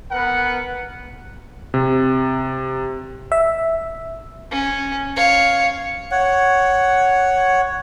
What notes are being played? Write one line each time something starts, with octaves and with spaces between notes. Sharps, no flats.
B3 A#4 B4 F#5
C3
E5
C#4
C#5 F5
C#5 F#5